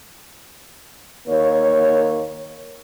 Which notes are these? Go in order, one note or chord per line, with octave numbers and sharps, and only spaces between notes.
D#2 A#3 C#5